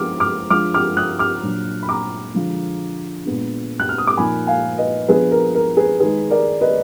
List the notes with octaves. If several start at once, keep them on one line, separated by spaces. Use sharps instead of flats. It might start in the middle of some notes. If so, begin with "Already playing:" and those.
Already playing: F3 G#3 B3 D4 D6 F6
D6 F6
F3 G#3 D4 D6 F6
D6 F6
D#6 F#6
D6 F6
A#2 F#3 D4
B5
A#5 D6
D3 F3 G#3
A#2 G#3 B3 D4
F#6
F6
D#6
D6
A#2 F3 A#3 D#4 G#5 B5
F5 G#5
B4 D#5
F3 B3 D4 G#4 B4
A#4
A#4
G#4 B4
D#3 G#3 D#4 G#4 B4
A#4 D5
B4 D#5